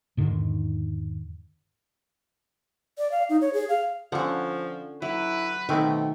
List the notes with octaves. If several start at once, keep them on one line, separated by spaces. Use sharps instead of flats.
E2 G#2 D3 D#3
D5
F5
D#4
C#5
G#4
F5
D3 F3 C#4 F#5
F#3 E4 B4
B2 D#3 A3 C4 B5 D6